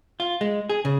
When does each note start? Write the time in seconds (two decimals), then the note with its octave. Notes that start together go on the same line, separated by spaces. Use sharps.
0.20 F4
0.41 G#3
0.69 G#4
0.85 C#3